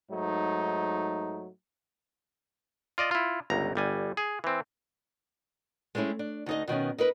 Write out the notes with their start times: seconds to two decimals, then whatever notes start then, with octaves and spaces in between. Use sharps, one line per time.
0.11 G#2 F#3 A3 D#4
2.98 F4 D5 D#5
3.11 E4 F4
3.50 G1 C#2 A#5
3.75 G1 G3 G#5
4.17 G#4
4.44 E3 C4
5.95 G#3 A3 C4 C#4 E4
6.19 D4
6.46 D2 D#4 D#5
6.68 B2 D#3 B3 C#4
6.98 D#4 A#4 B4